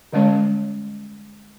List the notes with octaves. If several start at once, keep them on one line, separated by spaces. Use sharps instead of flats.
D3 G3 G#3 C#4 C#5